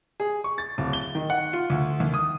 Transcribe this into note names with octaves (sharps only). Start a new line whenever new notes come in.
G#4
C#6
A6
D1
G7
D#3
F#5
F4
D2
D#2
D#6